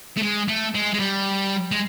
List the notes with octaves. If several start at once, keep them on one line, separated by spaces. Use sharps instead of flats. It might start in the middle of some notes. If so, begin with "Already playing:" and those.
A3
G#3
A3
G#3
G#3
G3
G#3